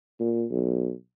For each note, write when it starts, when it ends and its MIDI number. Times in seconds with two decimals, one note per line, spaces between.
0.20 0.45 46
0.51 0.91 35